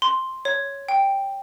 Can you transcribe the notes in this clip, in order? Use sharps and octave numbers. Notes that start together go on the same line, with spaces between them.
C6
C#5
G5